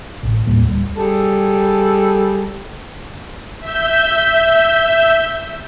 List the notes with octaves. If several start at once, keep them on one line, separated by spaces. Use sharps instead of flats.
A1
D#2 A2 G3 A#3
D1 G3
G3 G#4 A4
E5 G6